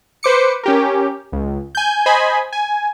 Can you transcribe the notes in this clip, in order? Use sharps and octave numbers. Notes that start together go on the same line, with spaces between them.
B4 C5 D6 C#7
C#4 G4 A#4
C#2
G#5 G6
C5 D#5 G#5 B5
G#5